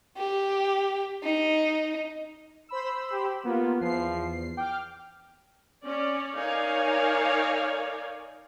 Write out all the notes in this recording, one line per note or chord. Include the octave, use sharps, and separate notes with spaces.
G4
D#4
C5 B5 E6
G4
A#3 B3 F4
E2 F3 C7
G5 D6 F6
C#4 D5
D#4 A#4 C#5 D5 F5 G#5